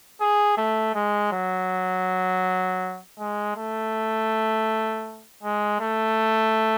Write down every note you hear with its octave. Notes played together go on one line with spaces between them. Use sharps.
G#4
A3
G#3
F#3
G#3
A3
G#3
A3